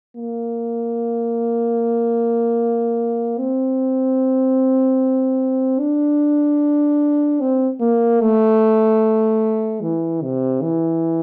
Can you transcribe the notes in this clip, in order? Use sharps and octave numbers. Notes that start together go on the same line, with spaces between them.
A#3
C4
D4
C4
A#3
A3
E3
C3
E3